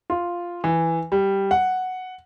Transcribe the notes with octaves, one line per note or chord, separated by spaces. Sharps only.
F4
E3
G3
F#5